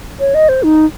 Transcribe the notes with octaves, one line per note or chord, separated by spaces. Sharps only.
C#5
D#5
C5
D#4